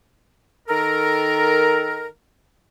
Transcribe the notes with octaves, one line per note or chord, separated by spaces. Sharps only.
D#3 A4 A#4